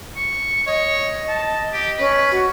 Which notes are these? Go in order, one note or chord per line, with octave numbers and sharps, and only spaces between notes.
C#6
C#5 D#5
A5
G4
C#4 B4
F#4